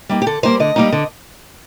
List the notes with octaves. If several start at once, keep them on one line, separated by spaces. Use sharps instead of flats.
G3 A#3 D#4
G4
D3 A4
G3 A#3 D#4 C5
D3 D#5
G3 A#3 D#4
D3